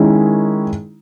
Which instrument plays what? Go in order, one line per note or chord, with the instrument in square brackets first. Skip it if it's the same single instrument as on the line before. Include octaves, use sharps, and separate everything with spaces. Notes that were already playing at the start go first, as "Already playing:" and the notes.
Already playing: [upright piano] D#3 G#3 C#4 E4